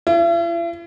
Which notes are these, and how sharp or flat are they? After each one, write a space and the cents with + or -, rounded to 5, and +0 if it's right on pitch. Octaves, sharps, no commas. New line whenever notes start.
E4 +45